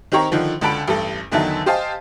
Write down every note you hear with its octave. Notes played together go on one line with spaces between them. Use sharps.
D#3 C4 G4 C#5 A#5
D3 D#3 F3
C#2 D3 A5 B5 D7
A1 G2 A4
E2 D3 D#3 F#3 E5 A5
G4 C5 D#5 F5 G#5 A5